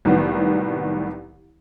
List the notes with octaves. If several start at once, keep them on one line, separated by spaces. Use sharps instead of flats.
C2 A2 D#3 F#3 B3